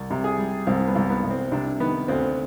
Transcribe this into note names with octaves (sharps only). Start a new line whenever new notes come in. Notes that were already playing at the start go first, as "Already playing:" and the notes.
Already playing: C2
C3
G#4
G3
C2 C4
B3
C2
B3
C2
C4
C3 D4
D#3 B3
D2 C4